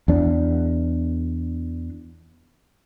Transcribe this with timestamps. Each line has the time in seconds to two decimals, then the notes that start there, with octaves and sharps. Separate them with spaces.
0.08 E2 D4